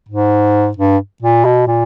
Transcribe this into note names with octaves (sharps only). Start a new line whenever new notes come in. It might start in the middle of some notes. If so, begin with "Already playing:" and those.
G#2
G2
A#2
B2
A#2